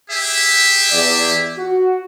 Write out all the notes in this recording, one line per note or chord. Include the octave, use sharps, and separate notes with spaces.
G4 G#4 E5
E2 D5
F#4